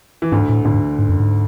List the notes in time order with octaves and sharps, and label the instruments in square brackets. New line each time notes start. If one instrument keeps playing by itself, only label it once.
[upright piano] E3
[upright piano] D2 D3 [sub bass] G#2
[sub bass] A2
[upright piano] D2 D3 [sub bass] A2
[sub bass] G#2
G#2
F#2
G#2